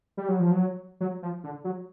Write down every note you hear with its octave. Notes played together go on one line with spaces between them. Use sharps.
G3
F#3
F3
F#3
F#3
F3
D3
F#3